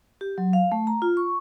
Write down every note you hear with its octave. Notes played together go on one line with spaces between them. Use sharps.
G4
F#3
F5
A3
A#5
F4
C#6